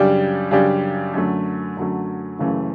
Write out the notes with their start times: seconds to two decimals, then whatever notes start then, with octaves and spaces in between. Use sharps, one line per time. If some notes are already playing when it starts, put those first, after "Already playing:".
Already playing: F#2 C#3 G3 D4 G4
0.51 F#2 C#3 G3 D4 G4
1.14 F#2 D3 F#3 A3
1.77 F#2 D3 F#3 A3
2.39 F#1 F#2 C#3 E3 A3